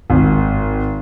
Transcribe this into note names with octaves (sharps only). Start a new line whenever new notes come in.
G#1